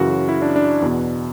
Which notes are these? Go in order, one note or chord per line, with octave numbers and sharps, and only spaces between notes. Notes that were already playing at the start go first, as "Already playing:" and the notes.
Already playing: F#2 C#3 E3 F#4
F#4
E4
D4
D4
E2 B2